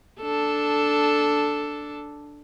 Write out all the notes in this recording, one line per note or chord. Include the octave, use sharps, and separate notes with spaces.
D4 A4